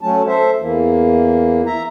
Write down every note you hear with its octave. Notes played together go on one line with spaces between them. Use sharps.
F#3 A3 C#4 A5
A4 C5 E5
E2 E3 A#3
E5 A#5